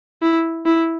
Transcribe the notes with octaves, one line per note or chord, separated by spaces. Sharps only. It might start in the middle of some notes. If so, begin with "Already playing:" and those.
E4
E4